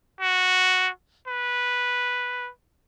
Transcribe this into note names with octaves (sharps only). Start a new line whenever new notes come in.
F#4
B4